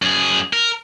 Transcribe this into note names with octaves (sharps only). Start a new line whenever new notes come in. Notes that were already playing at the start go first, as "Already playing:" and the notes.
F#2 G#4
A#4